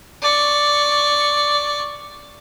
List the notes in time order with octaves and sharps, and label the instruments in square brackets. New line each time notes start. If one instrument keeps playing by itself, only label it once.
[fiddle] D5 C#6